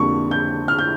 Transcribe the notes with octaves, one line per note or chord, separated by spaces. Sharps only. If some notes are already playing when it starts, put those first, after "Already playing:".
Already playing: F2 D3 G3 A#3 C#6
G6
F6
G6